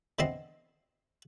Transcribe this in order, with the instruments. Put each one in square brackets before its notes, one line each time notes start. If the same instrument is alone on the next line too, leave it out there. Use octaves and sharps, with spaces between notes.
[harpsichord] D3 E3 B3 C4 D#5 C6